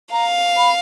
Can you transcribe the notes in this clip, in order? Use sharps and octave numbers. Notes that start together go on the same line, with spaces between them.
F5 A#5
B5